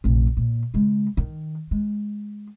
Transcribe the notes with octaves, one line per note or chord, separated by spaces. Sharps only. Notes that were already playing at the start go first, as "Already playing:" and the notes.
F1 A#1
A#2
C#3 G#3
D#3
G#3